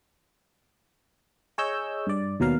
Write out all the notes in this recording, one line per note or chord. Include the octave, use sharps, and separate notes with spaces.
G#4 C#5 D#5 E6 G6
G2 D5
D#2 B2 F#3 A#4 F5